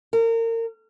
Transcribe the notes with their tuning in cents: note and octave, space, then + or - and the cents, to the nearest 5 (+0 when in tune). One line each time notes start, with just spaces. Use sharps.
A#4 -30